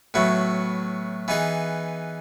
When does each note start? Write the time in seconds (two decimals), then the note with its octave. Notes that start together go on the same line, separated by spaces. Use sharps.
0.14 A2 F#3 B3 E4
1.28 E3 B3 D#4 G#4